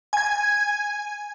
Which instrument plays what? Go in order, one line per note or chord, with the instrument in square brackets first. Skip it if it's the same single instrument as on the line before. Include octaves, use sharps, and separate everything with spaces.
[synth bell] G#5 G#6